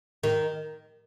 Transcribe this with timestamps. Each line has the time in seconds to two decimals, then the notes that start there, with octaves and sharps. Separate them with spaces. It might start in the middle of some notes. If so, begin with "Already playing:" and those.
0.23 D#3